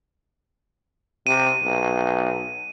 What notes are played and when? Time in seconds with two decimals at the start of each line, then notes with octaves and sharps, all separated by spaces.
1.27 C3 D#7
1.64 B1